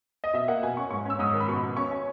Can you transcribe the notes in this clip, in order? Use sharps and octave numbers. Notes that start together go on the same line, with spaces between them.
D#5
B2 E5
A#3 F#5
B2 G#5
C#4 C#6
G#2 C#6
C#4 E6
G#2 D#6
D#3
B5
B2 C#6
B2
C#4 C#6
C#4